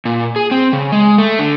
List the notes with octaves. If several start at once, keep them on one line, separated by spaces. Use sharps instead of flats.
A#2
G#4
C4
C#3
G#3
A3
D3